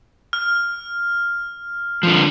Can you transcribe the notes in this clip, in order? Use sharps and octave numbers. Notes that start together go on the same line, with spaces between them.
F6
D3 F3